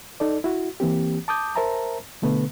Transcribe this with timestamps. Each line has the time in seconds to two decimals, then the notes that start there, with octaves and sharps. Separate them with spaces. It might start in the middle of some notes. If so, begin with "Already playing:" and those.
0.20 D#4 A4 D5
0.44 E4 F#4
0.80 E3 A#3 C4 G4
1.28 A5 D6 D#6 G6
1.56 A#4 C5 E5 A5 A#5
2.22 B2 D3 A3 B3 B4